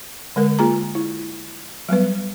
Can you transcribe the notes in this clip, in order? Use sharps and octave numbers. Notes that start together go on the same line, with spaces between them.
D3 G#3 A#4
A#3 F4 G#4 A#5
E4
F#3 G3 B3 B4